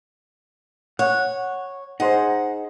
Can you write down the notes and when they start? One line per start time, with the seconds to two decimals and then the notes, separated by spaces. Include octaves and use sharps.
0.99 C#5 F#5
2.00 D#4 G#4 C5 F#5